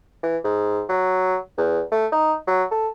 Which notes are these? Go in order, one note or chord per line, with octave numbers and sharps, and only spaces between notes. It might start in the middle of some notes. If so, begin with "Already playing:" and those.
E3
G#2
F#3
E2
A3
D#4
F#3
A4